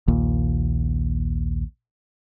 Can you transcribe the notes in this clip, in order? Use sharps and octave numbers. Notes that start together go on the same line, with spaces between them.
A#1 D#2 A#2